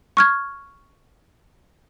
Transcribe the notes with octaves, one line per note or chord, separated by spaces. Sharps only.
C#6 F6 G#6